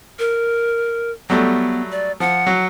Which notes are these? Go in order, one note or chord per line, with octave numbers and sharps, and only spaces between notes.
A#4
F#3 G3 A3 B3
D5
F3 F#5
F#3